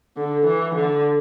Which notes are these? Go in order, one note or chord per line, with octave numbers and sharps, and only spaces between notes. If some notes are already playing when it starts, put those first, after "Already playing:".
D3
E3
D3